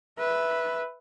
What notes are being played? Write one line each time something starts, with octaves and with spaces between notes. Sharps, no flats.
B4 E5